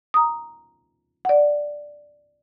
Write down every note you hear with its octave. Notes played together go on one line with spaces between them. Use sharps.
A#5 D#6
D5 F#5